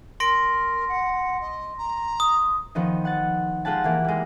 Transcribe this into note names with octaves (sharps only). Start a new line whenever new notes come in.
A#4 C6 A#6 D7
F#5
D#5
A#5
D#6
D#3 F3 B3 D#4
F#5 A6
G#3 F4 G4 F#5 A5
E3 A#3
G3 G#3